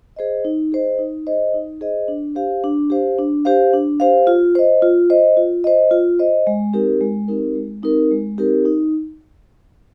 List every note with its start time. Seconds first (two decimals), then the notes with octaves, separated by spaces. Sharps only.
0.16 G#4 C5 D#5
0.45 D#4
0.72 G#4 C5 D#5
0.99 D#4
1.27 G#4 C5 D#5
1.54 D#4
1.81 G#4 C5 D#5
2.08 D4
2.35 G4 C5 F5
2.64 D4
2.90 G4 C5 F5
3.19 D4
3.45 G4 C5 F5
3.73 D4
4.00 G4 C5 F5
4.27 F4
4.55 C5 D#5
4.82 F4
5.10 C5 D#5
5.37 F4
5.64 C5 D#5
5.91 F4
6.19 C5 D#5
6.47 G#3
6.73 C4 D#4 G4 A#4
7.01 G#3
7.28 C4 D#4 G4 A#4
7.55 G#3
7.83 C4 D#4 G4 A#4
8.11 G#3
8.38 C4 D#4 G4 A#4
8.65 D#4